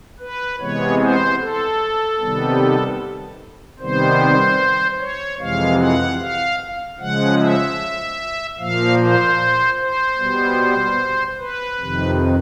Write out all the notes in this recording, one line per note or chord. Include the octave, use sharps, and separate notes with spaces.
B4
C3 E3 G#3 B3 C#5
C5
A4
C3 D#3 G3 B3
C3 D#3 G3 B3 C5
C#5
F2 C3 E3 G#3 F5
F#5
F5
C#3 F3 G#3 F#5
E5
A#2 F3 A#3 F5
C5
C5
B2 G3 B3
B4
F2 C3 D#3